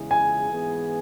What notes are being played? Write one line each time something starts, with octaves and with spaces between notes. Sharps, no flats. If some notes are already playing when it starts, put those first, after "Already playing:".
Already playing: E2 C#3 G#3 E4 G#4
G#5
G#2 E3 B3 G#4